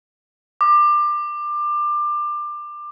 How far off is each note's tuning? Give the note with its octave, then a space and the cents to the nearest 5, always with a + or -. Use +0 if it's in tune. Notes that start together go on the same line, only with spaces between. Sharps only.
D6 +20